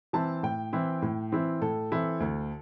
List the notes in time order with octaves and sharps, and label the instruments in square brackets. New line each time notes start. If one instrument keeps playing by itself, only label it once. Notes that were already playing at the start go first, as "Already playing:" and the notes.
[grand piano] E3 C4 E4 A5
A2 G5
E3 C4 E4
A2
E3 C4 E4
A2 A4
E3 C4 E4
D2